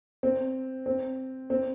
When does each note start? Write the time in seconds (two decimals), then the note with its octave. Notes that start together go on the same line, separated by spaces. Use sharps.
0.23 C4
0.86 C4
1.50 C4